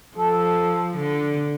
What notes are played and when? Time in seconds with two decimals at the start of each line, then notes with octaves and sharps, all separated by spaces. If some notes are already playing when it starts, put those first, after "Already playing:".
0.17 F3 A4
0.97 D3